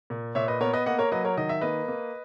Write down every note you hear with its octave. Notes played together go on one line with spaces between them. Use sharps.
A#2
A#2 C#5 E5
B4 D#5
B3 A#4 C#5
B4 D#5
A#3 D#5 F#5
A#4 C#5
F#3 B4 D#5
A#4 C#5
D#3 D#5
E5
A#3 B4 D#5
A#3